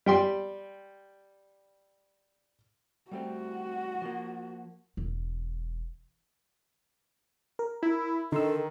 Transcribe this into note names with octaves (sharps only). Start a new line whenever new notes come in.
G3 G5 C6
G3 A3 C4 F#4
F3 A#3
E1
A#4
E4
D3 D#3 A4 C6 E6